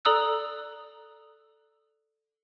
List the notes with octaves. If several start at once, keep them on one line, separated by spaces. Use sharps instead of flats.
A4 D5 A#5 D#6 E6 F#6